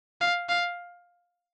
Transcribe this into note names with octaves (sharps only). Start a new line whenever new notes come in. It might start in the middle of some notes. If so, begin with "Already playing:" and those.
F5
F5